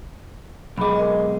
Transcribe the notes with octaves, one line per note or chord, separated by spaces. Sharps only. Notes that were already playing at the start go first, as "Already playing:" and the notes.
B1 G#3 B5 D6
A#4 D#5